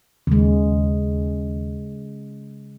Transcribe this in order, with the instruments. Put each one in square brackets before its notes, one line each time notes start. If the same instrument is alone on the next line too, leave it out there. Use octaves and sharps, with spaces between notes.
[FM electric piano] D#2 [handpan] C#3 G#3